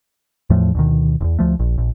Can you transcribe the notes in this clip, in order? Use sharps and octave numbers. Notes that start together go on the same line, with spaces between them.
E2 A2 F3 A3
D2 B2 D#3
E1 E2
D2 F3 A3
A#1
A#1